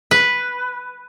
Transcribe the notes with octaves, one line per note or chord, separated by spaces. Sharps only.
B4